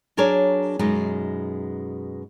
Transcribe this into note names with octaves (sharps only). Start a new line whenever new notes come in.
F#3 D4 G#4 A#4 C#5
F#2 B2 G#3 D#4